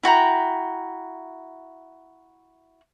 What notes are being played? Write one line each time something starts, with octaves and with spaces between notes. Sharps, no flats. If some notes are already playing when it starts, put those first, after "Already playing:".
E4 F#4 G5 A#5